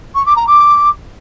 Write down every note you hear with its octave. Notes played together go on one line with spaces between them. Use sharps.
C#6
D6
A#5
D6